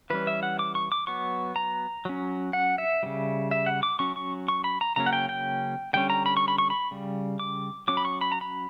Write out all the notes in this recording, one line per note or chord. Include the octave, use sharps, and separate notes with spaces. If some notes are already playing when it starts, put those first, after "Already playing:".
E3 G3 C#4 B4
E5
F#5
D6
C#6
D6
F#3 B3 C#6
A#5
F#3 C#4
F#5
E5
C#3 E3 G3
E5
F#5
D6
F#3 C#4 C#6
C#6
C#6
B5
A#5
C#3 F#3 A#3 C#4 A#5
F#5
G5
G5
D3 G3 C#4 G5
A#5
B5
C#6
B5
C#6
B5
C#3 G3
D6
F#3 C#4 D6
B5
C#6
B5
A#5
B5